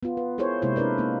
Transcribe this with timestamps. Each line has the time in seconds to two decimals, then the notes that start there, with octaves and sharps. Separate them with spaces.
0.03 B3 F4
0.17 B4
0.38 E4 G#4 A#4 C5 C#5
0.62 C3 G#3 A#3 D#4 E4 C5
0.76 D4 E4 A#4 B4 D5
0.98 A#3 D#4